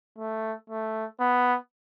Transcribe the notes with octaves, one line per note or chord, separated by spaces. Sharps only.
A3
A3
B3